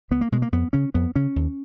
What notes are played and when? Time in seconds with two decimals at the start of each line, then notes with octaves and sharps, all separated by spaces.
0.11 C#2 B3
0.21 A#3
0.32 B2 G#3
0.42 A#3
0.52 F2 B3
0.73 C#3 C#4
0.94 F2 B3
1.15 C#3 C#4
1.36 D#2